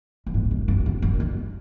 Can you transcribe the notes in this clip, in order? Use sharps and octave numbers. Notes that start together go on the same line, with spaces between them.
F#2
G#2
F#2
F#2
F#2
F#2
F#2